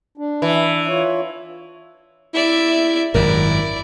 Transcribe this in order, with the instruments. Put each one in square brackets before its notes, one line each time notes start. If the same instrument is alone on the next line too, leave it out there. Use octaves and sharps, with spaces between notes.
[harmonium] D4
[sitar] E3
[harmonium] F4 C#5
[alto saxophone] E4 [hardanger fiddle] D5 E5
[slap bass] G#1 F#2 [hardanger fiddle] E4 D5 [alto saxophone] A#4